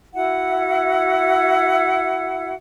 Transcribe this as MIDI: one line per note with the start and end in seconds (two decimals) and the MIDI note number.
0.14 2.53 64
0.14 2.53 66
0.14 2.53 76
0.14 2.53 78